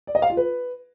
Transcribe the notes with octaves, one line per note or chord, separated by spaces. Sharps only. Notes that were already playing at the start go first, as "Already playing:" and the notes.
D5
D#5
F5
F4
B4